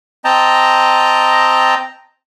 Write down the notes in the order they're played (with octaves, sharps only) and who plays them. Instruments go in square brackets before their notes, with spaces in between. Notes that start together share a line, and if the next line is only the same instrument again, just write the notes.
[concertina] C4 D#5 G5 A5 A#5